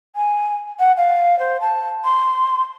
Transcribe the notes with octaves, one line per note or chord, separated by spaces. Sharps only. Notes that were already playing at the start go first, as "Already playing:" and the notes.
G#5
F#5
F5
C5
A5
C6